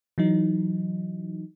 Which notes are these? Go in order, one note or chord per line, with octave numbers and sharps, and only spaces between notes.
E3 F#3 D#4